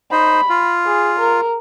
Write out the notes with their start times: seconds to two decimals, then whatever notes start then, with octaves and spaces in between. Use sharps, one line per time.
0.12 D#4 C5 B5
0.50 F4
0.86 G#4
1.19 A#4